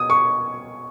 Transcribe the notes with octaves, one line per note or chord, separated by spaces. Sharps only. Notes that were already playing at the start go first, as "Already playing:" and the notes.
Already playing: B2 D#6
C#6